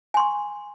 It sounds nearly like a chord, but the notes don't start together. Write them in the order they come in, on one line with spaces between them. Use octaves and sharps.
G#5 C6 C#6